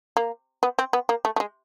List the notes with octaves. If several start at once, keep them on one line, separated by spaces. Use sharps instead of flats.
A#3
B3
C4
B3
A#3
A3
A3
G#3